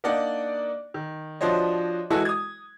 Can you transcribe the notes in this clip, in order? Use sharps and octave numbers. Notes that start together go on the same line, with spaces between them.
A#3 D4 D#4 D5 F#5
D#3
F3 D4 F#4 C5 C#5 D#5
E3 G#3 E4 F#4 A4
D#6 G#6